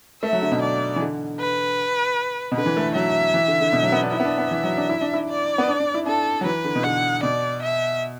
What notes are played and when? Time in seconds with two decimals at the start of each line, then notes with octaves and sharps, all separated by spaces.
0.23 A3 E5
0.33 F#3
0.42 D3
0.52 B2
0.62 D5
0.96 E3
1.01 D3
1.39 B4
2.52 B2
2.56 D3 B4
2.66 E3
2.76 A3
2.95 F#3 E5
3.34 E3
3.48 D3
3.61 D3
3.73 B2
3.83 F#3
3.92 B3
4.02 D4
4.12 E4 E5
4.20 B3
4.25 D4
4.38 B3
4.51 E3
4.64 F#3
4.77 D4
4.89 E4
5.01 D4
5.13 E4
5.29 D5
5.58 B3
5.68 D4
5.80 D4
5.94 E4
6.06 D4 A4
6.41 F#3
6.45 E3 B4
6.64 D3
6.75 B2
6.84 D3 F#5
7.23 B2 D5
7.62 E5